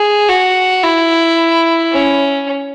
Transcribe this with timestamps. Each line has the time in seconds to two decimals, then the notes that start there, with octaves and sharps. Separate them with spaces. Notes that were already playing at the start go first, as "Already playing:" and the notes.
Already playing: G#4
0.29 F#4
0.83 E4
1.92 C#4